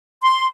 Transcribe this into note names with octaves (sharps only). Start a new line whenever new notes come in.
C6